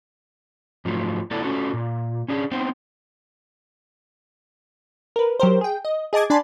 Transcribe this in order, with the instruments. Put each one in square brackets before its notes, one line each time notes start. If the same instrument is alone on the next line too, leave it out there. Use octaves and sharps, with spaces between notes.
[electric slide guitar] G#2 F3 F#3 A3
A3 B3 E4 A4 B4 D5
A3 C#4 F#4 A4
A#2
C#4 D4 G#4
B3 C4 D#4 C5 G5
[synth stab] A#4 B4
F#3 G4 A#4 C5
G#4 G5
D#5
G#4 D#5 A5 D6 G#6
D4 D5 G#5 A5 B5 C6